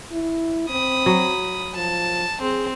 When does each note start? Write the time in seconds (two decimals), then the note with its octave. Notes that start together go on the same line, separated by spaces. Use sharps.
0.12 E4
0.69 C4 B5 D#6
1.06 F#3
1.75 F3 A5
2.42 C4 G#4